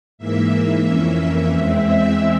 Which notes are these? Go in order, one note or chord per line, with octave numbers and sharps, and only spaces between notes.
G#2 E3 A#3 E5
F2 E3 A#3 C#4
E2 E3 G#3 C4 E4 E5